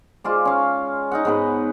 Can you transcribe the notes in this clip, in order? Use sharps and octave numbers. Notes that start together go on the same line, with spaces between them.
G#3 F4 C5 D5
C#4 F5
D#4 D#5 F#5
G#2 B3 B4